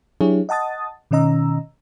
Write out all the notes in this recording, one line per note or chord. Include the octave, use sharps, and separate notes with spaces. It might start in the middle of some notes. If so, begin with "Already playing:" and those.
F#3 D4 E4 G4 G#4 C#5
D#5 F#5 A5 D#6 A6
B2 D#3 C#4 D#5 A#5 E6